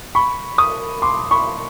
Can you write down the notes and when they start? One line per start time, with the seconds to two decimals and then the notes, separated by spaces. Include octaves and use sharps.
0.15 B5 C#6
0.58 C#6 D#6
1.02 C6 D6
1.31 B5 C#6